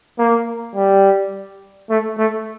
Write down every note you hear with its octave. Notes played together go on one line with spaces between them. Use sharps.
A#3
G3
A3
A3